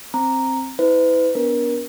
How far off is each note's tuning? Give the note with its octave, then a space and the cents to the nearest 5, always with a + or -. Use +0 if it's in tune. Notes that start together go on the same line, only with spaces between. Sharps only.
C4 +10 A#5 -5
E4 -30 B4 +40
B3 +0 D4 -30 A#4 +30